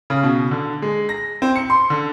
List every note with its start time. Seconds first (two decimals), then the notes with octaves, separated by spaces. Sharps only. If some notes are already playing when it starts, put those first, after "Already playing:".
0.10 C#3
0.23 B2
0.51 D3
0.82 G#3
1.09 A#6
1.42 C4
1.56 C#7
1.70 C6
1.90 D3